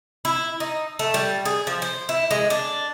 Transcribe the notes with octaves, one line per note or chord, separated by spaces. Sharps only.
E4
D#4
A3
G3
G#4
F3
C5
E4
G#3
D4